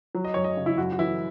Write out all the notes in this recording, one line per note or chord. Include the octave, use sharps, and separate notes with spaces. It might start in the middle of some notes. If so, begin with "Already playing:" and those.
F#3
D#5
F#2 C#5
D#5
C#3
E4
F#2 F#4
F#4
E3 E4